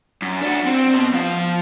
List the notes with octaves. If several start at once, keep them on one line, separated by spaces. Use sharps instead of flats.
F#2
D4 F#4
C4
B2
F3 F5